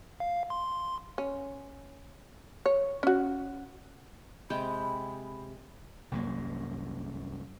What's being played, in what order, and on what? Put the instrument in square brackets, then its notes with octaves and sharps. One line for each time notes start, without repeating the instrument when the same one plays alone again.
[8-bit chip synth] F5
C6
[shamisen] C#4
C#5
C#4 F#4
[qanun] C3 G#3 G5 [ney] B5
[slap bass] C2 F#2 A#3